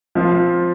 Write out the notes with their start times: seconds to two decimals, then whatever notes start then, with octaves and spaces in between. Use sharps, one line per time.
0.15 F3 C4 F4 C5